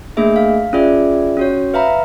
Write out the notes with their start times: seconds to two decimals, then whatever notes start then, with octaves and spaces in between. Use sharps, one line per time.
0.17 A3 A#3 D4 G#4 E5
0.36 F5
0.73 C#4 F4 G#4 D5 E5
1.37 C#4 F#4 C#5
1.74 B4 E5 F5 A#5 B5